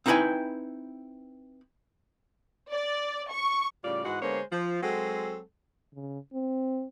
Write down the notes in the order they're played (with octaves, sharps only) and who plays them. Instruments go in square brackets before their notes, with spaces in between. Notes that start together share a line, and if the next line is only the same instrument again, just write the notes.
[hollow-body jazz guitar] C4 D#4 E4 B4 G5 G#5
[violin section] D5
C#6
[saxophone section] A2 C#3 G3 F4 D5
G#2 E3 G#3 F#4 F#5
D3 G#3 A#3 B3 C5 C#5
F3
F#3 G#3 C4 F#4 A4
[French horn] C#3
C4